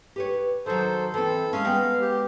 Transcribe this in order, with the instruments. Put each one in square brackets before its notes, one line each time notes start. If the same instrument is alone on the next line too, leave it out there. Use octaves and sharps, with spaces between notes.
[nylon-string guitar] G4 B4 C#5
[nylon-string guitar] D#3 F#3 [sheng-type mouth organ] A4 C5
[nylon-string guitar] E3 C4 [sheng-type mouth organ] A4
[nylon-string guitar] G#3 C#4 [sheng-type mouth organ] F5
[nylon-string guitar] G#3 B3 G5
[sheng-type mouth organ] G4